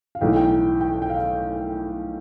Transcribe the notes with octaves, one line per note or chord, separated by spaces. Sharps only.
F5
B1 A2 E3 G5
G5
G5
G5
F5